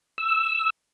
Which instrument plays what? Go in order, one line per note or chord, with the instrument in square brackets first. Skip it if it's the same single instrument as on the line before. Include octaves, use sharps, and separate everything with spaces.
[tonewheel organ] E6